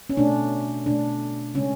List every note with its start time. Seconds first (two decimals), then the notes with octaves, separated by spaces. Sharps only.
0.10 C#4
0.17 B2 A3 D4
0.86 B2 A3 D4
1.55 C#3 G#3 C#4